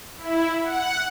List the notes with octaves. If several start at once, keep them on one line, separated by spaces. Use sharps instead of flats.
E4
F#5